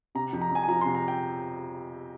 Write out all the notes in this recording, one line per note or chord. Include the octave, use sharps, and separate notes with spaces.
C3 A#5
F2
A#5
F2 G#5
G#5
F3 A#5
C6
C3
A#5
G5